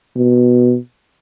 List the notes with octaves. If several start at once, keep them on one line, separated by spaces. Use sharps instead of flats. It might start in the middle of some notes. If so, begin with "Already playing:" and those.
B2